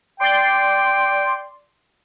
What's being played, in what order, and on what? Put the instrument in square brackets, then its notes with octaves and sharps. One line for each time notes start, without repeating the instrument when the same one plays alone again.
[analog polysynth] D5 C6 [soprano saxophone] G5